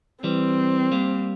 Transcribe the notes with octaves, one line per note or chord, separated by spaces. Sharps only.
E3 G3 C4
G3 A#3